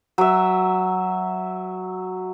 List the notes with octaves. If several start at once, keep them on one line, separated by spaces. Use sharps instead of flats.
F#3 E5